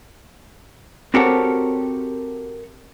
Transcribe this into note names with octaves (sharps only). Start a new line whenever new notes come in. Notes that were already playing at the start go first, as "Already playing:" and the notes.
C4 F#4 G4 A4 A#4 C#5